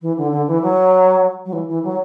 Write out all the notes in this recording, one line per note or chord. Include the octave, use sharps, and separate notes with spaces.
E3
D3
D3
E3
F#3
F#3
E3
E3
F#3